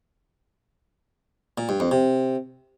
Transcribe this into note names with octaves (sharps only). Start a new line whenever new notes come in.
A#2
G2
F2
C3